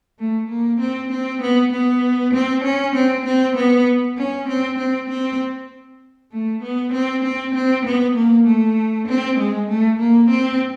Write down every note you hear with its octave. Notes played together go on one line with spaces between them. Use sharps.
A3
A#3
C4
C4
B3
B3
C4
C#4
C4
C4
B3
C#4
C4
C4
C4
A3
B3
C4
C4
C4
B3
A#3
A3
C4
G#3
A3
A#3
C4